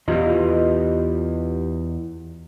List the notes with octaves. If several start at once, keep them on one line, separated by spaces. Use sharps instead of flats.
E2 E3 F4 G4 D#5